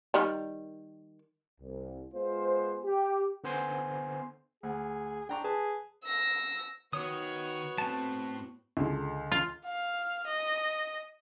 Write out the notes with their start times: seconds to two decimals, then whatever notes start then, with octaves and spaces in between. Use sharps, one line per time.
0.14 D#3 G3
1.61 C2
2.13 G#3 B3 F4 C5
2.84 G4
3.44 D3 B3 C5 G#5 C6
4.63 D2 G#4
5.29 D4 G5 A#5 C#6
5.44 G#4 B4 A5
6.05 E6 A#6
6.93 D#3 B3 F#4 C#5 D#6
7.78 A2 A3 C4 A5
8.77 C#2 D3
9.32 F4
9.65 F5
10.27 D#5